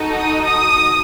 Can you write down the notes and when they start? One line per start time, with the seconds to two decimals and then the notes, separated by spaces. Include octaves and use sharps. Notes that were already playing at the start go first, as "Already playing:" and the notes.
Already playing: D#4 F#4 A4
0.16 D#6
0.45 D#6